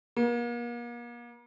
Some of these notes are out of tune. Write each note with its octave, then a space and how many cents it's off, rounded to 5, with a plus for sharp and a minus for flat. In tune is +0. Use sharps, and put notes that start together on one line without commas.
A#3 +40